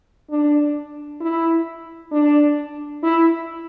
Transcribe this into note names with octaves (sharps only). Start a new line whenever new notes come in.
D4
E4
D4
E4